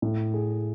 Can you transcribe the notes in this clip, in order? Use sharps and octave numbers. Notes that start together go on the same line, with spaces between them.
A2
G#4